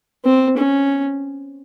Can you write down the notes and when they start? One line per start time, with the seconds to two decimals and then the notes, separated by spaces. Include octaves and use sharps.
0.25 C4
0.57 C#4